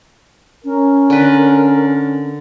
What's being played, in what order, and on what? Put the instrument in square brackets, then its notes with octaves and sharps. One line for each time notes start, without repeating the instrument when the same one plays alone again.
[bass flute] C#4 [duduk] A#4
[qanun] D3 B4